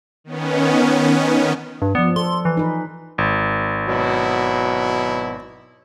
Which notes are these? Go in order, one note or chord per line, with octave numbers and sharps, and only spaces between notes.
D#3 B3 C#4
G2
F3 B3 D5
A4 C6
E3
D#4 B4
G#1
B2 F#3 E4